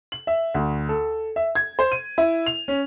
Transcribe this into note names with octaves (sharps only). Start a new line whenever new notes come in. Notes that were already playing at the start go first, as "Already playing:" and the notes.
F#7
E5
D2
A4
E5
G#6
C5
D#7
E4
F7
C#4